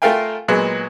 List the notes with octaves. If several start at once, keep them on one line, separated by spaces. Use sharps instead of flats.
A3 F4 A#4 F5 G5 G#5
A#2 F#3 G#3 B3